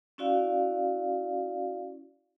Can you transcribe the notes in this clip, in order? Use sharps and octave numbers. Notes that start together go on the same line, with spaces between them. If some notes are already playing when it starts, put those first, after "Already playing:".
C#4 E4 F#4 D5 F5